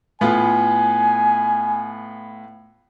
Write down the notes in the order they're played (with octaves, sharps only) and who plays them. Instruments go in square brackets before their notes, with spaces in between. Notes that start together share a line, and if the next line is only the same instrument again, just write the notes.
[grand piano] A2 B3 F4 [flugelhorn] G#5